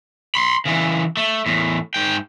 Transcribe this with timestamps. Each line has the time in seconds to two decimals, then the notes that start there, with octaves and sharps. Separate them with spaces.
0.35 B5 C6
0.65 C#3 E3
1.17 A3
1.46 E2 A2
1.94 G#2 G5